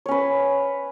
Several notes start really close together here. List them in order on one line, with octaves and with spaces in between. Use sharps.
C#5 C#4 B4